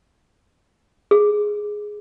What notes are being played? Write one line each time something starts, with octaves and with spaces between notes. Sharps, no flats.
G#4